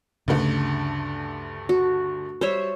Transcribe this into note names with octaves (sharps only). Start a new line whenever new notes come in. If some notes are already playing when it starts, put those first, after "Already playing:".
D2 G2 C#3 A3
F#4
G3 C5 C#5 E5